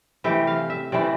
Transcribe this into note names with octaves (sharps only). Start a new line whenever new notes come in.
C3 E3 A3 G4
F5
E5
C3 E3 A3 D5